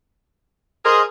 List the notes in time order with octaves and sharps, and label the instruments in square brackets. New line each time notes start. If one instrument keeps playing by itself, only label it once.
[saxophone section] G#4 A#4 [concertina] C5 D#5